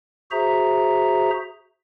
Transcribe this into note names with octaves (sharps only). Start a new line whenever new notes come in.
F#4 G#4 C5 E5 A#5